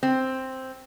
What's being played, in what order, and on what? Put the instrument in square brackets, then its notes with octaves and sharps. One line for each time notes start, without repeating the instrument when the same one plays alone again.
[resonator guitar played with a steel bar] C4